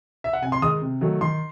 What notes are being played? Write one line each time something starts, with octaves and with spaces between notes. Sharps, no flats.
E5
F#5
C3 G#5
C6
D#3 G#3 D#6
C3
D#3 F#3 A3
D#3 C6